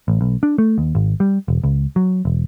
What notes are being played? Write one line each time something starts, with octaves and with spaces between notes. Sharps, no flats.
A1
B1
D4
A3
D#2
G#1
G3
E1
C#2
F#3
E1